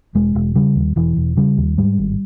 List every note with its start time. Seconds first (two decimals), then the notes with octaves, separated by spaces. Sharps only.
0.15 E1 G#3
0.35 E1
0.55 C#3 G3
0.76 D#2
0.96 E1 E3
1.17 E1
1.37 C#3 G3
1.57 D#2
1.78 G#2 G3
1.98 G#1